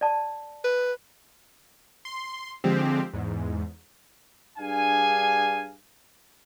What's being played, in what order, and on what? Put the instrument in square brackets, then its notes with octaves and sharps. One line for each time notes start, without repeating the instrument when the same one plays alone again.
[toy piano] D5 A5
[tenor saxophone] B4
[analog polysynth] C6
D3 F3 G#3 C4 G4
E2 G#2
[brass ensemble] G2 D4 G#4 F5 G#5